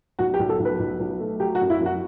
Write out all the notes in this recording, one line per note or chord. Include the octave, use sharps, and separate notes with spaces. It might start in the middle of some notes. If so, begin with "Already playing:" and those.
B1 F#4
G4
B1
A4
B1
B4
B1
B1
A3
F#3 G4
F#4
F#2
E4
F#2
F#4